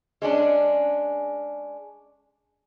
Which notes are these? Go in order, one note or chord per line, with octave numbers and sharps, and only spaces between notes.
G#3 C#4 D4